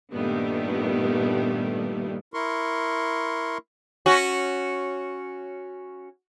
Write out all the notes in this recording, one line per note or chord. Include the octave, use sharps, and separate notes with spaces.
G2 A#2 D#3 G3 A3 B3
E4 A#4 C6 C#6
C#4 F#4